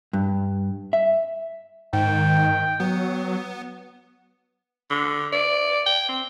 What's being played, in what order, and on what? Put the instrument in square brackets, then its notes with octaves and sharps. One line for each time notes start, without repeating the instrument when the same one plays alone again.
[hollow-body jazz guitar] G2
E5
[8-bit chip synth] G#2 [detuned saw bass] D#3 [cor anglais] G5
[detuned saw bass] F#3 [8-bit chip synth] B3
[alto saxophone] D3
D5
G5
C4